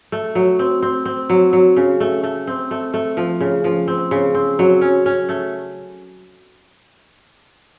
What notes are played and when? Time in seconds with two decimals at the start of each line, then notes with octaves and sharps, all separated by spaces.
0.12 A3
0.35 F#3
0.59 C4
0.83 C4
1.06 C4
1.30 F#3
1.53 F#3
1.77 C#3
2.00 A3
2.23 A3
2.47 C4
2.71 A3
2.94 A3
3.17 F3
3.41 C#3
3.64 F3
3.88 C4
4.11 C#3
4.35 C4
4.59 F#3
4.81 C#4
5.06 C#4
5.29 A3